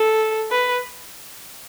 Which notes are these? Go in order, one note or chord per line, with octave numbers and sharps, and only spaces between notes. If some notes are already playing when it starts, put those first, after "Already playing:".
Already playing: A4
B4